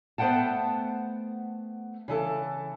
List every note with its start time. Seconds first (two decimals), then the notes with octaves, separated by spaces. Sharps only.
0.18 A3 B3 C5 F#5 G5 A5
2.08 C#3 E3 A4